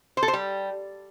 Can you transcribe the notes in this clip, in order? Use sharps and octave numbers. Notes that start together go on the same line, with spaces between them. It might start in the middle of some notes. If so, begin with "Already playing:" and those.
C5
A4
C5
G3